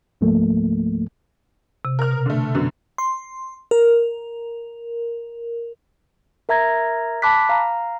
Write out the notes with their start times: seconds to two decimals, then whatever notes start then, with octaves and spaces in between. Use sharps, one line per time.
0.21 C#2 G#2 F3 A3 A#3
1.85 C3
1.99 A#4 F6
2.11 B2
2.26 D3 A3
2.55 F#2 D3 B3
2.98 C6
3.71 A#4
6.49 A#4 E5 A#5 G#6 A#6
7.22 A5 B5 D6 F#6 B6
7.49 F5 A#5